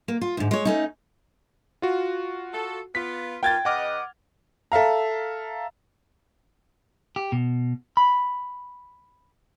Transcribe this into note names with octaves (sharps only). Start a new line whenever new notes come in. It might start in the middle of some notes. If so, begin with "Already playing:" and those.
A#3
F4
D2 G#2
G#3 C#5
A3 C#4 D#4
F4 F#4
A4
B3 F4 B6
A#3 F4 G5 G#6 A6
C#3 B4 D#5 F#5 D6 F6
A4 E5 F5 A#5
G4
B2
B5